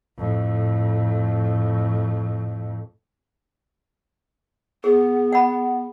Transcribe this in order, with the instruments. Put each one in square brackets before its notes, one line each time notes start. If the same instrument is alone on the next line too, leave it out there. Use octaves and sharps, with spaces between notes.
[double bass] F2 A2
[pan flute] B3 [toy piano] G#4
[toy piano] F#5 B5